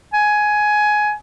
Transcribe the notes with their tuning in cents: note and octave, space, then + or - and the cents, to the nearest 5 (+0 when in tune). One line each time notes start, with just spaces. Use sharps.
G#5 +15